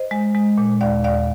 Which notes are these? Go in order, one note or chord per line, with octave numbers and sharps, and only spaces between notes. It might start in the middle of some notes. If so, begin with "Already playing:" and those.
Already playing: C5 D#5
G#3
G#3
A#2
D#2 D5 F5
D#2 D5 F5